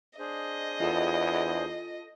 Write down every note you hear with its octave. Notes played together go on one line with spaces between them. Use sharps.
D4 G#4 C5 D#5
E2 F4 A4